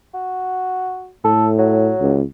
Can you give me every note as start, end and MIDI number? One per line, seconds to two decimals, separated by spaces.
0.14 1.10 66
1.25 1.92 45
1.25 1.47 69
1.58 2.15 54
2.01 2.22 37